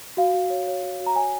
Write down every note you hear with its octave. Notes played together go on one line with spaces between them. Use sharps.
F#4 F5
F#4
C#5
C#5
F#4
F#4
A#5
C#5 G#5